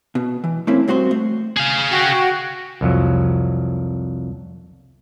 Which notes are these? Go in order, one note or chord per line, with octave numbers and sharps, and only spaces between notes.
B2
E3
A3 A#3 C4 C#4 E4
G2 C4 F#4 C5 C6
A3
G#4 F5
F#4 G5
C2 F2 F#3